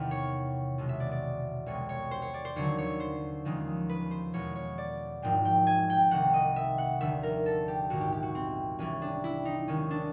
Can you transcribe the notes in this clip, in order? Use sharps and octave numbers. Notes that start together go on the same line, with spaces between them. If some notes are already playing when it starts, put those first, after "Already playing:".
Already playing: E2 C3 D#3
C#5
B1 B2 G#3
E5
D5
D5
C2 B2 G#3 C#5
C#5
C5
C#5
D5
C5
D#2 D3 F#3 C#5
C#5
C5
D#2 C#3 F3 G#3
B4
C5
E2 B2 G#3 C#5
C#5
D5
G#1 G#2 F3 G#3 G5
G5
G#5
G5
C2 C3 D#3 F#5
D#5
E5
F#5
F1 D#2 D3 E5
A#4
A4
G4
A#1 G#2 D#3 G#3 F#4
G4
G4
F#4
C4
C2 C3 E3 G3 C#4
D4
E4
D#4
D#2 D#3 G#3 C#4
D4